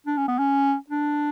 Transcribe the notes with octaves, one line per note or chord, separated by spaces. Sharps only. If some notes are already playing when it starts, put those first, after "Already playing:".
D4
C#4
B3
C#4
D4